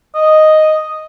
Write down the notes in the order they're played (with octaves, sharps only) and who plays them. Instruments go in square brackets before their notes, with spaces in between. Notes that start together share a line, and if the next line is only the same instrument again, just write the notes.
[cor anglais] D#5